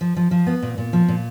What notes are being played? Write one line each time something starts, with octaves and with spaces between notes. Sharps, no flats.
F3
F3
F3
B3
A#2
A#2
F3
A#2